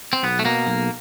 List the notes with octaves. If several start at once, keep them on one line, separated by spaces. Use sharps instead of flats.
C4
B1 B3
A3
B2 A#3
B1